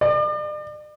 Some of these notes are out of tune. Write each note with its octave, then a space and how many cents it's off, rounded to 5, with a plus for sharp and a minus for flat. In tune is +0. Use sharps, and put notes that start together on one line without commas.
D5 +40